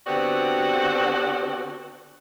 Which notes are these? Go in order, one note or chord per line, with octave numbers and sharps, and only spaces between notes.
D3 B3 C4 F#4 G4 D5